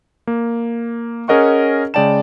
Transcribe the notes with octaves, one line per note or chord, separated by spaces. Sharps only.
A#3
C#4 G#4 A#4 D#5 F#5 C#6
C#3 G#3 D5 G5 A5 E7